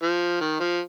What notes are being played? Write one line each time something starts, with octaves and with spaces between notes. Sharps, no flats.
F3
D#3
F3